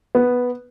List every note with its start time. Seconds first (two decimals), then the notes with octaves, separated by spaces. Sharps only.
0.15 B3